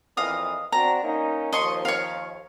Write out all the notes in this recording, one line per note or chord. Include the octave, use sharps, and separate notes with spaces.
F2 A#2 E3 D#5 F5 D#6
C4 D4 F#4 A#5
A#3 C#4 D#4
D#2 F3 D#5 C6 C#6
C#5 F5